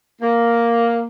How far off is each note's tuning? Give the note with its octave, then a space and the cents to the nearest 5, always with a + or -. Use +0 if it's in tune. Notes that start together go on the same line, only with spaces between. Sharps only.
A#3 +0